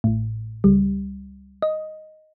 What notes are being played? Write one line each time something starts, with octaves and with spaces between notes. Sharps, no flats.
A1 A2
C#2 G3
D#5